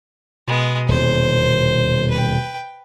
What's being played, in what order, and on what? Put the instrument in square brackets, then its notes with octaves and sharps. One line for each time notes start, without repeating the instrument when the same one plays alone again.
[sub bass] B2 [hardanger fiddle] G#3 B3
[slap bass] D#1 E2 [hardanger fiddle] C5
[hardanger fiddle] B4 G5